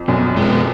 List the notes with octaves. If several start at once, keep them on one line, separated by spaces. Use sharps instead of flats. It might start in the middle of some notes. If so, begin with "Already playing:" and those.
Already playing: F2
F#2 B2
F2 G#3
B3